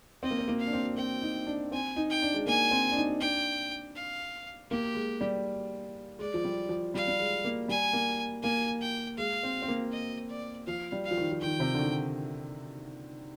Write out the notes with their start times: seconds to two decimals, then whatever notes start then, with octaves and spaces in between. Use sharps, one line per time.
0.23 C4 D#5
0.30 A#3
0.39 C4
0.48 A#3
0.60 F5
0.67 D4
0.73 C4
0.97 C4 G5
1.22 D#4
1.47 D4
1.72 C4 G#5
1.96 D#4
2.10 G5
2.22 D4
2.34 G#3
2.47 A#3 G#5
2.71 C4
2.92 D4
2.97 D#4
3.21 D4 G5
3.96 F5
4.71 A#3 G4
4.95 G#3
5.21 G3
6.19 G#3 D5
6.34 F3
6.44 G3
6.69 F3
6.94 G3 F5
7.08 G3
7.20 G#3
7.45 A#3
7.68 G3 G#5
7.93 A#3
8.43 A#3 G#5
8.81 G5
9.18 G#3 F5
9.43 C4
9.62 C4
9.68 A#3
9.92 D#5
10.29 D5
10.67 F3 F5
10.92 G3
11.05 F5
11.11 F3
11.17 D#3
11.31 F3
11.41 D#3 G5
11.60 C3
11.74 D3
11.79 D#3